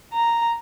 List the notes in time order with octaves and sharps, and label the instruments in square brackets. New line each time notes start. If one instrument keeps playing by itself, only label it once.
[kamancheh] A#5